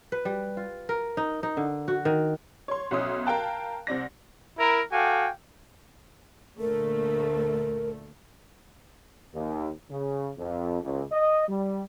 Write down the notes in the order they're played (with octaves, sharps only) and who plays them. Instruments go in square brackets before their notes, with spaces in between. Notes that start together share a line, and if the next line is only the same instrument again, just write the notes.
[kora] B4
G3
F4
A#4
D#4
D#4
D3
F#4
D#3
[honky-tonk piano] C#5 C6
B1 B2 C#4 E5 C6 D#6
A#4 F5 G5 A5 F#6
C2 C4 D5 A#6
[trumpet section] E4 A#4
F#4 A4 F5 G5 G#5 D6
[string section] D2 A#2 A3 [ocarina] A#4
[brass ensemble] D#2
C#3
F2
C#2
D#5
G3